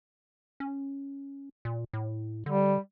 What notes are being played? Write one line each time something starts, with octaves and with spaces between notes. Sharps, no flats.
C#4
A#2
A2
D3 G3